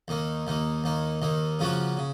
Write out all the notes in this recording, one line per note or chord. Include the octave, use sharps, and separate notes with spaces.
D#2 D#3 A#3
D#2 D#3 A#3
D#2 D#3 A#3
D#2 D#3 A#3
C#3 F3 A#3 C#4 F#4
C#3